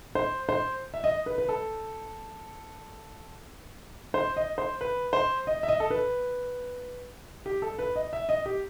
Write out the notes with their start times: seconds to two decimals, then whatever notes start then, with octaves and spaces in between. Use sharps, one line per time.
0.15 C5
0.49 C5
0.94 E5
1.04 D#5
1.26 B4
1.38 B4
1.49 A4
4.14 C5
4.36 D#5
4.58 C5
4.81 B4
5.13 C5
5.47 D#5
5.63 E5
5.69 D#5
5.80 A4
5.90 B4
7.46 G4
7.62 A4
7.79 B4
7.96 D#5
8.13 E5
8.29 D#5
8.46 G4